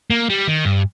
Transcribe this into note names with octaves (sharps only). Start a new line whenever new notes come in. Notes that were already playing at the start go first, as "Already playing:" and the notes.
A#3
G3
D#3
G2